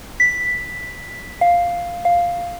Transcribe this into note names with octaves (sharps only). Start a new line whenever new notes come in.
B6
F5
F5